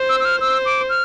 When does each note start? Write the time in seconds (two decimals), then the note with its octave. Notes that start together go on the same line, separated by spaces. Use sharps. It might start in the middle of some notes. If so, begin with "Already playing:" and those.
Already playing: C5
0.09 E6
0.20 E6
0.25 F6
0.41 C5 E6
0.65 D6
0.89 F6